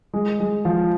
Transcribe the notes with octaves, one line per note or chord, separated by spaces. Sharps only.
G#3
G#3
F3